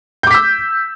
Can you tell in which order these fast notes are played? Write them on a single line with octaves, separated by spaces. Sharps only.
G6 D6 B6 E6